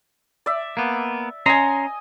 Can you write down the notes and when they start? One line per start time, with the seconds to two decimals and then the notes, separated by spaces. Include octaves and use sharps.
0.46 D5 E5
0.77 A#3 B3
1.46 C#4 D#5 G#5 A#5 C6